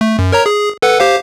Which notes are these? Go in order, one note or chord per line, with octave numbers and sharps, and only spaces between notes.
A3
F#2
A#4 C#5 A#5
G#4
A4 B4 F#5
G4 C5 F5